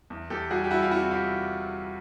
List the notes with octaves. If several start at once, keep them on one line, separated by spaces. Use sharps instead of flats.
E2
E2 G4 A4
G3 F#4 G#4
G4
G3 E4 F#4
F4
C3 E4 F#4
E3 F4 G4